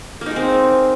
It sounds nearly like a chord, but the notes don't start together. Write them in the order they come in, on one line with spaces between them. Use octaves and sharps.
A#3 D#4 G#3 C4